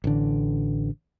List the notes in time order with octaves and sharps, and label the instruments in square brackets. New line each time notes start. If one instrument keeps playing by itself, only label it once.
[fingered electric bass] A1 D3